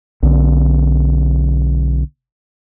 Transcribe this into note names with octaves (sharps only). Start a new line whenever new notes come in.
B1 D3